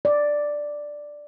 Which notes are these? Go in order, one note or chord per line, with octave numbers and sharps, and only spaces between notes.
D5